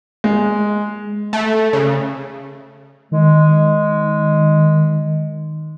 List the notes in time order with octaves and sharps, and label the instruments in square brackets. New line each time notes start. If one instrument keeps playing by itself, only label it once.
[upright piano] G#3
[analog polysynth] A3
C#3
[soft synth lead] D#3 [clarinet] G#3